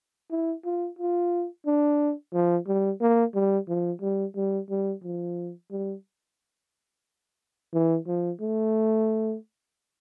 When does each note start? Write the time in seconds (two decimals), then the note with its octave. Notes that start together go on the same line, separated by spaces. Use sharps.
0.31 E4
0.65 F4
0.99 F4
1.66 D4
2.33 F3
2.67 G3
3.01 A#3
3.35 G3
3.68 F3
4.02 G3
4.36 G3
4.70 G3
5.04 F3
5.71 G3
7.74 E3
8.07 F3
8.41 A3